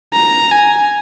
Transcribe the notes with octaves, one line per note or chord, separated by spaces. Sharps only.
A#5
G#5